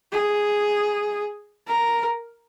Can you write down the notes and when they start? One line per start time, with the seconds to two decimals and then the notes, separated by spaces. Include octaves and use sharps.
0.12 G#4
1.68 A#4